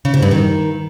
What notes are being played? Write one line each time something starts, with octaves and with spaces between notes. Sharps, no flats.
C#3
G#2
G2
D#3